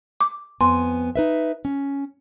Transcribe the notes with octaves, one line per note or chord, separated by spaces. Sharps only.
D6
F2 B3 G#5 C6
D#4 B4 E5
C#4